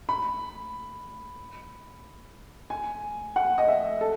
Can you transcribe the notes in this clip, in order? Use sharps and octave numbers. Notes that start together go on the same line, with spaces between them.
B5
G#5
F#5
D#5
E5
A4